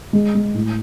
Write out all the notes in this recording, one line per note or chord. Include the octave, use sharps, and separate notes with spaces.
G#3
G#3
A2